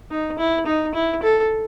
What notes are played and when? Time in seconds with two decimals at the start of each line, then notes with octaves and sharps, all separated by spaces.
0.11 D#4
0.39 E4
0.66 D#4
0.94 E4
1.23 A4